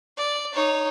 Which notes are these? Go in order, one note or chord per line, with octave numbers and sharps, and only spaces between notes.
D5
D#4 C#5